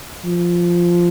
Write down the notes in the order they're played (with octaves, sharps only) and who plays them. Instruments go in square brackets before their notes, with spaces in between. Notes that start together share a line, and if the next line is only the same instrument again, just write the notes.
[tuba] F3